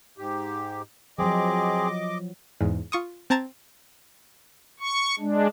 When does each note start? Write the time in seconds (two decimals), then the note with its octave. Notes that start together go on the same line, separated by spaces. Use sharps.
0.18 G#2 G4
1.19 F3 F#3 C4 G#4 D#5 D6
2.61 E2 G#2
2.92 F4 C#6 D#6
3.30 C4 A5 A#5 G#6 A6
4.80 C#6
5.19 G#3 D4